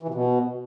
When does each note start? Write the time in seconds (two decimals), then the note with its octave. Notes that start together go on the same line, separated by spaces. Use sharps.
0.03 E3
0.08 C3
0.14 B2